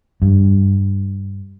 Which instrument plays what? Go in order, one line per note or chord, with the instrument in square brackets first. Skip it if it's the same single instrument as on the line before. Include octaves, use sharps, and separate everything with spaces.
[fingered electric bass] G2